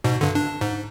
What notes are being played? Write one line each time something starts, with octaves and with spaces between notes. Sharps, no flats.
G#2 B2
G2 D3
D4
G#2